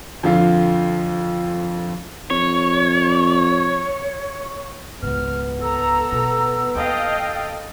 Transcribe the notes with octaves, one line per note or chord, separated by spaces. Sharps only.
F2 D3 F3 F4
F2 C#5
C#2 G#2 B3 F6
A4 A#5 E6
B2
D#2 A4 D#5 F5 G5